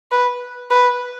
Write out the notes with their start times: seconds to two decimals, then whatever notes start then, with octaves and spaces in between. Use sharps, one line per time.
0.11 B4
0.71 B4